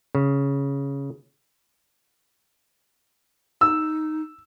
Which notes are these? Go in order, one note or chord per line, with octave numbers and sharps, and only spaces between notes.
C#3
D#4 E6